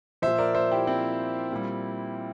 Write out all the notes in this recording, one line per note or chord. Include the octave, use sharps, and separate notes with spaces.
A#2 F3 C5 E5
A#4 D5
C5 E5
E4 G4
C4 E4
A#2 G3